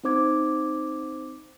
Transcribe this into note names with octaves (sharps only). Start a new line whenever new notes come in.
C4 D#4 C5 D6 G#6